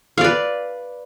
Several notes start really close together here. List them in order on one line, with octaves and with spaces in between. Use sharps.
F5 D5 B4